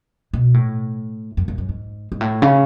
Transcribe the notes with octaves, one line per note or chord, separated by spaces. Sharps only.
B2
A2
F#2
F#2
F#2
G#2
G#2
A2
C#3